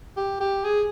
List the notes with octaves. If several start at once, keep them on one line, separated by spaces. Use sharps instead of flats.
G4
G4
G#4